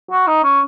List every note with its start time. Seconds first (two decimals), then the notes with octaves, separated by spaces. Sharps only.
0.11 F#4
0.27 D#4
0.43 C#4